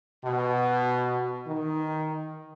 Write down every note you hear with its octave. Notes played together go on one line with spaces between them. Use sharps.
B2
D#3